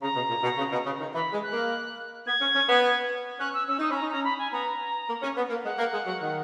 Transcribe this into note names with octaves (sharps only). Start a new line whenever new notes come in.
C#3 A#5
B2
A#2
B2
C#3
B2
C#3
D#3
E3 B5
G#3
F#6
A#3
B3 G#6
C#4
C#4
B3
C#4 F#6
E6
C#4 E6
D#4 D#6
C#4 B5
A#5
D#4
C#4 A#5
B5
G#5
B3 A#5
A#3
C#4
B3
A#3
G#3 F#5
A#3
G#3
F#3
D#3